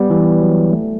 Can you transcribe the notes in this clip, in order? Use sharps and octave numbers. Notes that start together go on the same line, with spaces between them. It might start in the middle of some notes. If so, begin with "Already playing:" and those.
Already playing: G3 B3
E3
F#3
A3